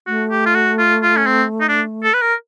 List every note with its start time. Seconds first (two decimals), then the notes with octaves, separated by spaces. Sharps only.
0.07 A3 F#4
0.31 G4
0.46 F4
0.55 F#4
0.79 F4
1.03 F4
1.16 C#4
1.27 C4
1.61 D#4
1.68 D4
2.03 A4
2.14 B4
2.22 A#4